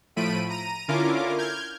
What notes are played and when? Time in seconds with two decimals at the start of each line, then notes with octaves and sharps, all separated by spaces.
0.16 A2 F3 A3 B5 D7 D#7
0.50 A#5 D#7
0.88 D3 C#4 E4 F4 A#4 D6
1.38 F6 G6 G#6